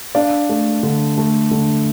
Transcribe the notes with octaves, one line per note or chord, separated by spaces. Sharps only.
D4 D5 F5
A3
D3
A3
D3